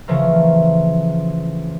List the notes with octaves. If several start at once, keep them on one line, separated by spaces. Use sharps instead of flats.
C#3 E3 F3 A3 A#4